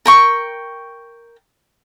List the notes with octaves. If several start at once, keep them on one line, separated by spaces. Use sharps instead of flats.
A#4 G5 C#6